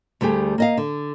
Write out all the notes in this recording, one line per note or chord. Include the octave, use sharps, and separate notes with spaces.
D2 G3 A3 G4 G#4
A#3 D#5 F5
D3